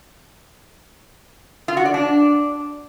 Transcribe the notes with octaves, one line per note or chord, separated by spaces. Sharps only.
F4
F#4
D5
D4